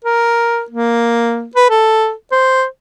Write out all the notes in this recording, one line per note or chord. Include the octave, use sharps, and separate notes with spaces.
A#4
A#3
B4
A4
C5